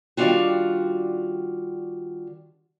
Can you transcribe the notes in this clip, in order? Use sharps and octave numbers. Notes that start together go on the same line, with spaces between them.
D#3 G3 D4 F4 F#4